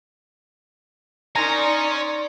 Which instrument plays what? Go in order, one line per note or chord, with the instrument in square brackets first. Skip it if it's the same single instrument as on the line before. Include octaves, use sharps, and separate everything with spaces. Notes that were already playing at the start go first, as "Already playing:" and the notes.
[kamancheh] D#4 A#4 [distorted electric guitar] C#5 G#5 [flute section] D5 C6 [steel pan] A#5